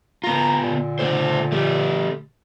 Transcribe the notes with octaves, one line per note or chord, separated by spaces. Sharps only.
B3 F4 A#5
A#2 D3
A3 A4 C5
A3 G4